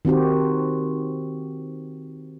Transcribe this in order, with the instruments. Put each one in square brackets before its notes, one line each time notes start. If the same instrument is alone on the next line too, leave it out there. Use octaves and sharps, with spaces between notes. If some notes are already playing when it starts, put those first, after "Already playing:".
[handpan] D#3 C4 F#4 G4